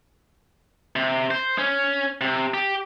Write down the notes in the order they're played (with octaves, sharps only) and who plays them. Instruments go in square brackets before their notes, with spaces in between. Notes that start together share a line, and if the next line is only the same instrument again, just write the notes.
[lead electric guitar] C3
C5
C#4
C3
G4